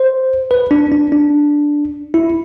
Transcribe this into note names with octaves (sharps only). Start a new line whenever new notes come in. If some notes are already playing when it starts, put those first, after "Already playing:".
Already playing: C5
B4
D4
D4
D4
E4